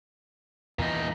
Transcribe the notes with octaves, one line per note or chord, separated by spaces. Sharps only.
E2 A#2 D#4